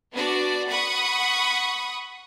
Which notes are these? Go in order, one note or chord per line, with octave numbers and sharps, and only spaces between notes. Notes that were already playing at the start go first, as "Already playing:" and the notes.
B3 D4 F#4 D5
F#5 B5 C#6 D#6